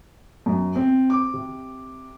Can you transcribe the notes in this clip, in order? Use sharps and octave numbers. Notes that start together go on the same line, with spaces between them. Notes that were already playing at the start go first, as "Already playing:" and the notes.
F#2
C4
D6
C3